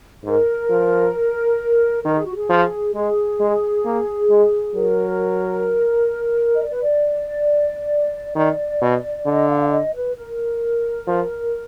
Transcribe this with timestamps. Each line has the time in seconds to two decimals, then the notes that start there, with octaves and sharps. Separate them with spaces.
0.24 G#2 A#4
0.70 F3
2.04 D#3 A#4
2.15 G#4
2.25 F#4
2.36 G#4
2.50 F3
2.95 G#3 G#4
3.40 G#3
3.85 A#3
4.30 G#3
4.75 F#3 A#4
6.55 D#5
6.63 D5
6.72 B4
6.80 D5
8.36 D#3 D5
8.81 B2
9.26 D3 D#5
9.49 F5
9.62 F5
9.71 D#5
9.94 B4
10.16 A#4
11.07 F3